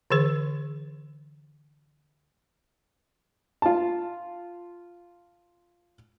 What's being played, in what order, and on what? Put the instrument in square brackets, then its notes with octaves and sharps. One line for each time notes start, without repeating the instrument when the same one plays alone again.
[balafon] D3 E3 G#4 C5
[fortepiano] F4 A5